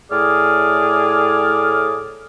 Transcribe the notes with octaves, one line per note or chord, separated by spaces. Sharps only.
A2 G#4 D5 F6